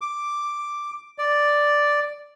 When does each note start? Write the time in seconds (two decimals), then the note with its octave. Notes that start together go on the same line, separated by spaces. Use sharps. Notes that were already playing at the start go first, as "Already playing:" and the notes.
0.01 D6
1.18 D5